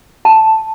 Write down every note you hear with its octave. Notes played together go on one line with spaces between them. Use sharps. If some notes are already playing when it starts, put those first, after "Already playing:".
A5